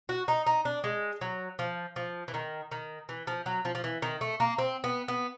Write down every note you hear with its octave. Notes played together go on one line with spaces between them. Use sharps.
F#4
D#4
D#4
D4
G#3
F#3
F3
F3
E3
D#3
D#3
E3
F3
F#3
F3
F3
E3
D#3
A3
A#3
C4
B3
B3